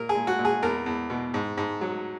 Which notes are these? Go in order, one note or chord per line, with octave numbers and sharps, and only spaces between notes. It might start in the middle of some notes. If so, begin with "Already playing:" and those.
Already playing: A#2 A#4
G#4
A#2
F#4
A#2
G#4
E2 A#4
E2
B2
G#2
G#2
F#3